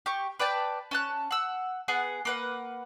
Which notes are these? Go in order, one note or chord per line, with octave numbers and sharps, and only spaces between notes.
G4 C#6
B4 D5 G5 A5
C#4 A5 F#6
F#5 E6
B3 G#4 F#5
A#3 B4 F#5